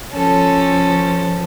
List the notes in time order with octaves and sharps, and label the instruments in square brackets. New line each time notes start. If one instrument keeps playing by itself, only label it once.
[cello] F3 [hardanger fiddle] C#4 A4